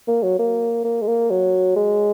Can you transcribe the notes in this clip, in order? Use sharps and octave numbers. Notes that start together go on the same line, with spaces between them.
A#3
F#3
A#3
A#3
G#3
A#3
F#3
G#3